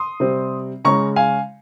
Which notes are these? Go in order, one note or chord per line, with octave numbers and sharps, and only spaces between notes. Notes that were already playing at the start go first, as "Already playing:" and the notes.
Already playing: C6 D#6
C3 G3 C4
C#3 G#3 C#4 A#5 C#6
F5 G#5